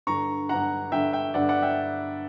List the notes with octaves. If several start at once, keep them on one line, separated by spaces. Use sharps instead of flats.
G2 D3 A#5 C#6
G2 D3 F#5 A#5
G2 D3 E5 G5
E5 G5
G2 D3 D5 F#5
D5 F#5
E5 G5